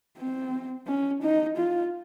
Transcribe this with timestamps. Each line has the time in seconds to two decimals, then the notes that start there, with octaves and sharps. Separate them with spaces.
0.18 C4
0.87 C#4
1.22 D#4
1.57 F4